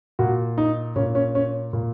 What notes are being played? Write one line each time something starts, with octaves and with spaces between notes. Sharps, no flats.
A#2 F#4
D#4
A#2 C#4
C#4
C#4
A#2